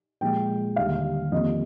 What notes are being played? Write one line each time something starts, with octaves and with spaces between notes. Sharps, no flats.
A#2 F3 G#3 G5
D#2 D3 G3 F5
F2 D#3 G3 A#3 D#5